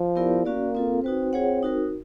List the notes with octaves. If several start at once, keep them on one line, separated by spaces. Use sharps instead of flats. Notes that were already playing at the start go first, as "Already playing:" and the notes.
Already playing: F3
B3 E4 G4 A#4 D5
A#3 C#4 F#4 A#4 D5
C4 F4 A4
C4 D#4 F#4 B4
F4 G#4 C#5 F#5
D#4 F#4 A#4